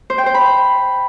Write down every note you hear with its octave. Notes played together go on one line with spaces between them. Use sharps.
C5
G5
C5
B5